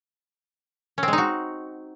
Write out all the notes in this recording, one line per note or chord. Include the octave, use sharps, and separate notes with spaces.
C#4
C4
G#3
D#4
F#4